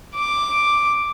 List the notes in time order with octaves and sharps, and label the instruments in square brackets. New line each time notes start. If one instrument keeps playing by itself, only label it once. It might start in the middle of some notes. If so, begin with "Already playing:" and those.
[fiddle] D6